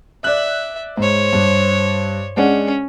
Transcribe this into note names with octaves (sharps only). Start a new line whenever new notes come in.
D5 E5 F#6
G#2 C5 C#5
G2
G#3 C#4 D4 F#5